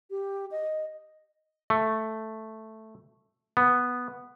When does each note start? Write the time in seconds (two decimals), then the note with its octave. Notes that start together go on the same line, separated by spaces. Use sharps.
0.11 G4
0.51 D#5
1.70 A3
3.57 B3